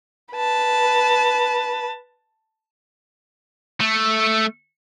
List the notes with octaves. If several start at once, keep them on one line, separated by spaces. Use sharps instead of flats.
B4 A5
A3